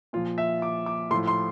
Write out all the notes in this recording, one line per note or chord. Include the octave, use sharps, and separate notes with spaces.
A#2 F3 F4
E5
D6
D6
A2 F3 C6
C6